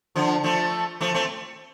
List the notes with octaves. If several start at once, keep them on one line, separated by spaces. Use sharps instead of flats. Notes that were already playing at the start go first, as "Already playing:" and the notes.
D3 F3
F3 A3
F3 A3
A3 C4